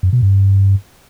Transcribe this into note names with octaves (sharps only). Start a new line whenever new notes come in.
F#2
B2
G2